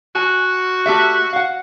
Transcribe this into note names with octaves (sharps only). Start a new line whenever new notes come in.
F#4 G#5
A3 G4 E5
F5 F#5